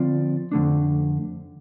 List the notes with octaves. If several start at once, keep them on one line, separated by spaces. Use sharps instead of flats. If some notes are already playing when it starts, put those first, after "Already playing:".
Already playing: D3 F3 C4 F4 D5
F2 D3 A3 D4